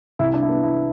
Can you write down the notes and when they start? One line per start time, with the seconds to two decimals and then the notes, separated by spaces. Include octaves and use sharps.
0.19 C2 E4
0.34 D4
0.42 E4
0.49 B3
0.63 E4